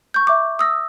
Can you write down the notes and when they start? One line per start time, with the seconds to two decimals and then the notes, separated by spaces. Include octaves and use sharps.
0.14 C#6 G6
0.27 E5 D6
0.59 D#6 E6 A#6